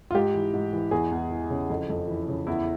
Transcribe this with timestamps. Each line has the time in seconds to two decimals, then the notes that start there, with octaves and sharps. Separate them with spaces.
0.11 F4
0.14 G#2 G4
0.34 E3
0.54 G#2
0.73 E3
0.91 E2 G#4
1.11 E2
1.31 E3
1.50 C#3
1.70 F2
1.90 F2
2.08 E3
2.28 C#3
2.47 E2 E4